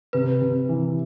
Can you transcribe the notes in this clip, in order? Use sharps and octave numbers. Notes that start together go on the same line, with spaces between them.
C3 B4
C3
E3